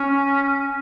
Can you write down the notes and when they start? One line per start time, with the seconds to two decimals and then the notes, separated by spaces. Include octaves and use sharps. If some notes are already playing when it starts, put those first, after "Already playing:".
Already playing: C#4